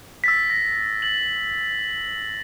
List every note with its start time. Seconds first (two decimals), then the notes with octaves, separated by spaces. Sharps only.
0.24 E6 A6 B6
0.50 A#6
1.02 A6 F#7